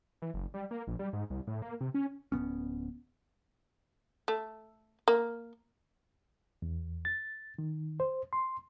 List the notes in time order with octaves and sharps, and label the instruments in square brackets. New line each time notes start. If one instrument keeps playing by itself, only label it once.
[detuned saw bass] E3
F#1
G3
A#3
A#1
G3
G#2
C2
A2
A#3
C3
C#4
[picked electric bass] D1 G#2 B3 C#4
[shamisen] A3
A#3
[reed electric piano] E2
A6
D#3
C5
C6